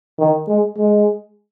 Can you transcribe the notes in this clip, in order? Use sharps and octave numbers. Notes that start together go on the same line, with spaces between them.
D#3
G#3
G#3